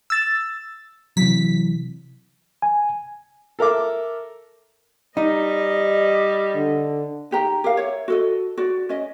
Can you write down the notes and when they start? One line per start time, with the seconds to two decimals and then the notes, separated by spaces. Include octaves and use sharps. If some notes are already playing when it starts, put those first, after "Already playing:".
0.10 E6 A6
1.17 C3 E3 F#3 B6
2.62 G#5
3.59 A4 A#4 E5 D6
5.17 G3 D#4 D#5
6.55 D3
7.31 D#4 G4 A#5
7.64 G4 A#4 F5
7.77 C#5 E5
8.08 F#4 A4 D#5
8.57 F#4 D5
8.89 C#4 D#5